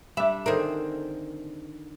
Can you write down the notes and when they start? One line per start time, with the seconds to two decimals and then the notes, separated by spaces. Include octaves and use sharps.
0.17 G3 D4 E5
0.46 D3 D#3 C4 G#4 A#4